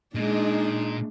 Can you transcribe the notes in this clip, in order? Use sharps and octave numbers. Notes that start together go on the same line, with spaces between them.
A#2 G#3 D4 D#4